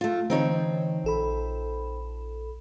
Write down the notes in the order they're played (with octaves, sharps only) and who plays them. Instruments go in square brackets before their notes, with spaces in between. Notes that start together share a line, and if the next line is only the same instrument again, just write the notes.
[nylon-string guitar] A3 F4
[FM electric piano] D3 E3 [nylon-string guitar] C4 D#4 C#5
[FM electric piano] A#1 A4 B5